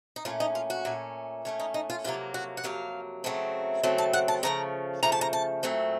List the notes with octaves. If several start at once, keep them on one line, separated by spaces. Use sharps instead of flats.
D#4
A#2 A3 C#4 F4
D#4
F4
F#4
A#2 A3 C#4
A#2 A3 C#4
D#4
D#4
F4
F2 C3 F#3 A#3 F4
F#4
F#5
F2 C3 F#3 A#3 F5
C#3 F#3 A3 C4
C#3 F#3 A3 C4 A5
A5
F#5
A5
C#3 F3 A3 A#5
C#3 F3 A3 A#5
A5
A#5
A5
A#2 F#3 A3 C4